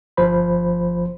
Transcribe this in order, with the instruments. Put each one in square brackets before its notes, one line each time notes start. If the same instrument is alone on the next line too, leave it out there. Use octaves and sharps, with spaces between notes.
[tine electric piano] G1 F3 C5 B5